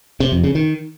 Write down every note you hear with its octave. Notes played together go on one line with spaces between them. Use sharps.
C3
F2
C#3
D#3